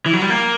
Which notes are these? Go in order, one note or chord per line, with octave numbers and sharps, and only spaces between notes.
E3
F#3
G3
A#3